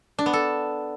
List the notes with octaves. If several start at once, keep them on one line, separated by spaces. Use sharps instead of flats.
D4
B3
A4